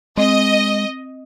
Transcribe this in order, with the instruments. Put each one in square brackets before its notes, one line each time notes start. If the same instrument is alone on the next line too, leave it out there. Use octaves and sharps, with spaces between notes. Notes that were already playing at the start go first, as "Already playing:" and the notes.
[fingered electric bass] G#3 [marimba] C4 [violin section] D#5